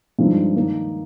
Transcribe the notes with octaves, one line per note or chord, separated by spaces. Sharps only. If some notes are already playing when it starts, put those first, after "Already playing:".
G2 F3 G#3 C4 D#4
D#3 A#3 D#4